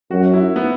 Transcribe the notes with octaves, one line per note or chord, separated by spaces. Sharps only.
F#2 F#4
E4
B3